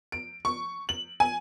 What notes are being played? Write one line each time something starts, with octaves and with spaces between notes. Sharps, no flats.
D7
C#6
F#7
G#5